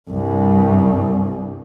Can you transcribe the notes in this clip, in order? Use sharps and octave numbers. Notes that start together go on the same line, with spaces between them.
C2 G2